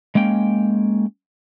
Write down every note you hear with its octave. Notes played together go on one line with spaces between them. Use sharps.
G#3 A#3 C#4 G5